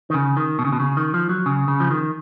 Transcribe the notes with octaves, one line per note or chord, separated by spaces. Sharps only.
D#3
C#3
D#3
B2
C#3
B2
C#3
D#3
F3
F#3
C#3
C#3
F3
D#3